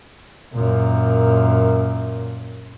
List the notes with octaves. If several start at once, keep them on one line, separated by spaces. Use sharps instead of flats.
F#2 A#2